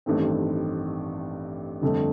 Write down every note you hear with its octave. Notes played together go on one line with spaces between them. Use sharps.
A1 G2 D#3 A3 C4
G1 F2 D3 A3